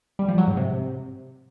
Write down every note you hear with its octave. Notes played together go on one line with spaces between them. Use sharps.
G3
F3
F#3
G#2
C3